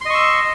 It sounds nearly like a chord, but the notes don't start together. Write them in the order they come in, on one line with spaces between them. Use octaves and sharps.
C6 D#5 C#6 E6